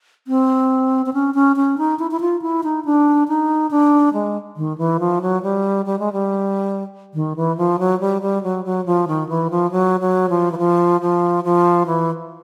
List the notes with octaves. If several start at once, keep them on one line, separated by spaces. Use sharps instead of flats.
C4
C4
C#4
C#4
C#4
D#4
E4
E4
F4
E4
D#4
D4
D#4
D4
G#3
D#3
E3
F3
F#3
G3
G3
G#3
G3
D#3
E3
F3
F#3
G3
G3
F#3
F#3
F3
D#3
E3
F3
F#3
F#3
F3
E3
F3
F3
F3
E3